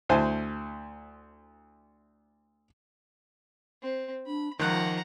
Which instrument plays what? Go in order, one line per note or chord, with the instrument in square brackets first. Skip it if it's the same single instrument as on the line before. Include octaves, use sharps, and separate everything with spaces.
[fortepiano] D2 E4 C5 G#5 A5
[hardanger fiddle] C4
[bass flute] D4 [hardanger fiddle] B5
[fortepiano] C#2 F#6 [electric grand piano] D#3 [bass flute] F3 [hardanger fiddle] F#5 A#5